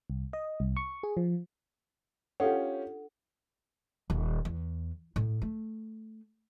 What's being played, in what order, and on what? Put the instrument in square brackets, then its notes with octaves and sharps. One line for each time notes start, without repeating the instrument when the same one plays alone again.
[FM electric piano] C2
D#5
C2
C#6
G#4
F3
[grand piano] C#4 F4 G4 [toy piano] D4 A4 F#5
[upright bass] D#1
E2
A2
A3